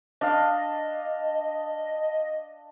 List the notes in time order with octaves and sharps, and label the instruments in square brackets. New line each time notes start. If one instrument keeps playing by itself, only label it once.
[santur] D4 F5 [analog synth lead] D#5